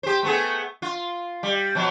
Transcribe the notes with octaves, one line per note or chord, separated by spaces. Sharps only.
G4 C5
A3 B3 G#4
F4
G3
B2 F3 F#3